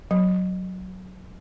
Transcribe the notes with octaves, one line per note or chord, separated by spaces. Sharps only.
F#3